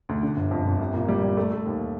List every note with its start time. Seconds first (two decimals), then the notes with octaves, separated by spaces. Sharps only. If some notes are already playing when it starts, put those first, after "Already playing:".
0.09 D2
0.23 D3
0.37 G1
0.51 F2
0.65 G1
0.79 C2
0.94 A#2
1.08 G3
1.23 G3
1.37 A3
1.51 A3
1.66 D#2